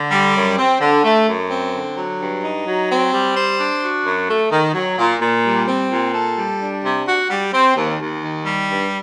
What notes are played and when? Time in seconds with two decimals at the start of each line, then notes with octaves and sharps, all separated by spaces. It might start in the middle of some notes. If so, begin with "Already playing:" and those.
Already playing: D3
0.11 G3
0.35 F#2
0.58 C4
0.80 D3
1.04 A3
1.27 F#2
1.50 C4
1.74 D3
1.97 F#3
2.20 G2
2.44 D#4
2.66 F#3
2.90 C4
3.13 G3
3.36 C5
3.60 D4
3.82 F#4
4.05 F#2
4.29 A3
4.51 D#3
4.74 F#3
4.98 A#2
5.21 A#2
5.45 G3
5.68 C4
5.90 A#2
6.14 A4
6.38 G3
6.60 D4
6.83 C3
7.07 F#4
7.30 G3
7.53 C4
7.76 D#2
7.99 D#2
8.22 D#3
8.46 G3
8.69 G2